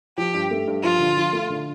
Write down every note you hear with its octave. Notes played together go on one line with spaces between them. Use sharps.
F3 G4
G2
A3
G2
F3 F4
D3
F3
A3
D3